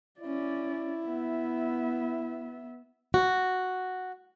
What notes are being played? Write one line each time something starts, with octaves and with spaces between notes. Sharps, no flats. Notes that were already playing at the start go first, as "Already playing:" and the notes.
C#4 E4 D5
B3 E5
F#4